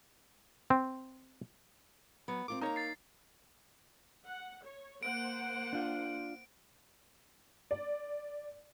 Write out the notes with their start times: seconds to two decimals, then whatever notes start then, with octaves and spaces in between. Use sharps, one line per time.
0.70 C4
2.28 F#3 B3
2.48 C4 F4 A#4 D6
2.61 A#3 D#4 C#5 A5 A#5
2.76 A6 C7
4.25 F#5
4.64 C#5
5.03 A#3 C5 F#5 D7
5.73 D4 F4
7.71 D5